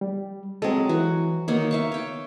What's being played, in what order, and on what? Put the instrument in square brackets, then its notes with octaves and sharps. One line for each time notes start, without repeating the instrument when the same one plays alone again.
[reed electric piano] G3
[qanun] F#3 G#3 [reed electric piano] C4 A4
[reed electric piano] E3 [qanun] F#4
[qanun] D#3 A#3 C#5 [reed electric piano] B3
[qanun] E5 F5 C#6
C#5 G5